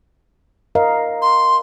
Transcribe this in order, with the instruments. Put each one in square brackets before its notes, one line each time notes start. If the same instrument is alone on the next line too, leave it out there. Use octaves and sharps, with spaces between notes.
[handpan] A#4 D#5 F5
[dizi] C6